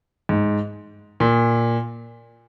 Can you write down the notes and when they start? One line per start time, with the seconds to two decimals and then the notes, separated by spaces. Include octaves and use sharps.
0.29 G#2
1.20 A#2